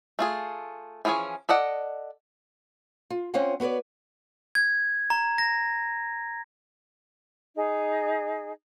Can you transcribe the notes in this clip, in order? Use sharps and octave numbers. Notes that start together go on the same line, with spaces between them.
A3 F4 G#4
E3 F3 C#4 G#4 C#5
A4 D5 D#5 F#5
F4
C4 C#4 F4 C5 F#5 G#5
B3 F#4 B4 C#5 D5
G#6
A#5
A#6
D#4 G#4